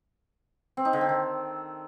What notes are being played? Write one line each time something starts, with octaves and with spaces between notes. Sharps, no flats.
C4
D#4
D3
C4
D#3